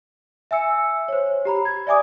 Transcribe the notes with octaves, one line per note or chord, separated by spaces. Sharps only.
E5 G#5 E6 C#7
C5 C#5
G4 A#5 B5
G#6
D5 E5 G#5 D6 D#6